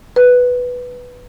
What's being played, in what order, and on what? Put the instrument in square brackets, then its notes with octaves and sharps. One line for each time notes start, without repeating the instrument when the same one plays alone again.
[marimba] B4